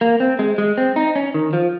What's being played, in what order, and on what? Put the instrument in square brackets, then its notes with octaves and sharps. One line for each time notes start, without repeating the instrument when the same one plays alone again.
[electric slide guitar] A#3
C4
G#3
G#3
C4
D#4
C#4
D#3
F3